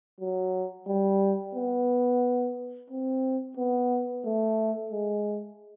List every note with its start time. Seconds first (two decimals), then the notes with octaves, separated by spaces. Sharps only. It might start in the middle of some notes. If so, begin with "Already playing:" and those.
0.20 F#3
0.87 G3
1.55 B3
2.90 C4
3.57 B3
4.25 A3
4.92 G#3